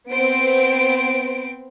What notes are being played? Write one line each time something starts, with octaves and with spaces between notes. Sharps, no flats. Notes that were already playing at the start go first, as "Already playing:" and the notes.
B3 C4 C5 D7